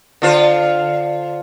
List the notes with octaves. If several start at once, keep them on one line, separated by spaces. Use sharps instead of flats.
D3 F4 C5